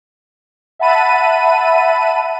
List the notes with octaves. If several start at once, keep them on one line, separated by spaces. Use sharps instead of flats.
E5 F#5 A5 B5 D#7